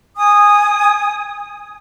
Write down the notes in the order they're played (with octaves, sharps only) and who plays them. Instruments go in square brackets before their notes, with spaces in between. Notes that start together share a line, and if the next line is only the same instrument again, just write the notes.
[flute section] G#5 D#6